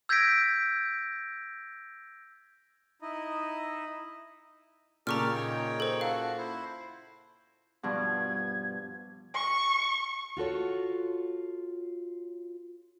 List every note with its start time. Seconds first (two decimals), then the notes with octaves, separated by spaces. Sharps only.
0.09 E6 G6 G#6 A#6 B6 D7
3.02 D#4 E4 D#5
5.07 A#2 C#3 G4 A4 D5 A#5 C#6 F6
5.35 D#4 C#5 G5
5.80 A4 C5
6.01 F#4 A4 F5
6.38 E4 C5
7.83 G2 B2 F3 G#6
9.35 C#6
10.37 F4 F#4 A4 C#5